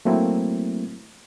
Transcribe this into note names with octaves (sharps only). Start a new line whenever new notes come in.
F#3 A3 A#3 C4 E4